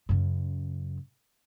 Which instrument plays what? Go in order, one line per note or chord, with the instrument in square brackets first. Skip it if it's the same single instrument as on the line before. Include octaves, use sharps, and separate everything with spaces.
[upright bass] F#2 C#3